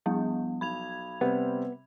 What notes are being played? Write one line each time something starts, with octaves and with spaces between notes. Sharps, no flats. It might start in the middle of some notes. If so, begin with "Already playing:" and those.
F3 G3 B3
B1 B5 G#6 F7
C3 G3 B3 C4